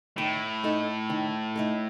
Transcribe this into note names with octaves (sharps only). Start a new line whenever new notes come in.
A2 D#3
A3 D#4 A4
D#3
A3 D#4 A4